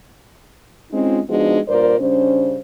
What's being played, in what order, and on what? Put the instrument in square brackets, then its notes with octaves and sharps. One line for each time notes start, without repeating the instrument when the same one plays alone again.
[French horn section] G#3 C4 C#4 D#4 F4
F3 G#3 B3 D4 D#4 F#4
G2 A#2 A#4 C5 D5
C#3 G3 C#4 D4 C5